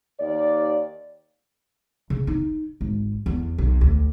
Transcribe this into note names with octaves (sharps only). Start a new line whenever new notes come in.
D#2 D5
C#3
D#4
G#1
E2
B1
D2